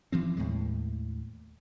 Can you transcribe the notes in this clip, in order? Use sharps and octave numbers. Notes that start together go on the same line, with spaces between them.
E3 F3 C4
D#2 A2 G#3